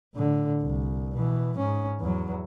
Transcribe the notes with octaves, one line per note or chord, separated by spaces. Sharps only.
A2 D3
C2
B2 E3
G#2 C#4
E2 F#3